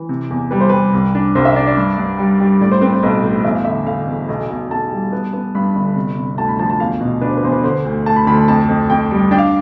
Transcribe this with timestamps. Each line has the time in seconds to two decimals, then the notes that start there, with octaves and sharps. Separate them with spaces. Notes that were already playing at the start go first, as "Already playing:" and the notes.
Already playing: E3
0.09 C3
0.30 E2
0.51 G3 B4
0.60 C5
0.69 G3 B4
0.93 C2
1.15 D4
1.35 C2 C5
1.45 E5
1.56 D4 D5
1.67 D5
1.77 G2
1.98 G2
2.19 G3
2.40 G3
2.61 A2 D5
2.71 C5
2.81 C4 B4
2.92 C5
3.03 B1 B4
3.23 A2
3.44 E2 E5
3.55 F5
3.64 D3 E5
3.87 D3 F5
4.07 E2
4.28 B1
4.50 B1
4.70 B1 A5
4.92 G3
5.12 B3
5.33 B3
5.55 G2 B5
5.75 G1
5.96 C3
6.18 C3
6.38 D2 A5
6.49 B5
6.59 F3 A5
6.70 A5
6.80 E2 F5
7.01 B2
7.21 D4 B4
7.29 C5
7.37 B4
7.43 E2 C5
7.52 B4
7.63 D3 C5
7.85 D2
8.06 A3 A5
8.16 B5
8.27 D2 B5
8.38 A5
8.48 F2 A5
8.69 F2
8.90 F2 G5
9.11 G3
9.31 D4 G5
9.38 F5